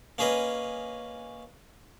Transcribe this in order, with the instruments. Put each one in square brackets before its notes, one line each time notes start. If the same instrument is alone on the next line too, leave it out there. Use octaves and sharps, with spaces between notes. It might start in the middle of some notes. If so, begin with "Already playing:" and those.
[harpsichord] A#3 C#4 G#4 B4 D#5